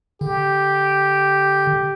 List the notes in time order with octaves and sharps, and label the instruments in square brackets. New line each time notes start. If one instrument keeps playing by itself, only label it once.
[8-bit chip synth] D3 [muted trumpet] G4